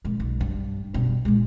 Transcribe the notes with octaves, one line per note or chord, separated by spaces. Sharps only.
A#1 G#3
B1
G2
G2 B2
A#2 G#3